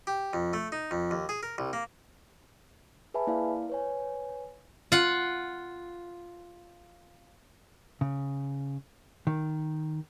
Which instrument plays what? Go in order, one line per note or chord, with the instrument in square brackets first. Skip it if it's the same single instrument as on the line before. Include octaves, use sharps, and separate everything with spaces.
[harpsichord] G4
F2
A3
D#4
F2
D#2
G#4
A#4
C2
A#3
[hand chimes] G#4 B4 E5 G#5 A5 B5
A#3 E4 D5 F5
B4 C#5 G#5
[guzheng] F4 F#5
[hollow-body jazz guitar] C#3
D#3